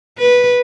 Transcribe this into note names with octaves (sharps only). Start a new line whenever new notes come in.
B4